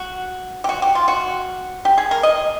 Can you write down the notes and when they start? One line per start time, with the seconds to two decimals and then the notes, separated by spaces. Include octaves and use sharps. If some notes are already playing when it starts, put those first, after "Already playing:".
Already playing: F#4
0.64 G4
0.69 F#4
0.82 G4
0.95 F4
1.08 F#4
1.85 G4
1.98 G#4
2.11 A#4
2.23 D#5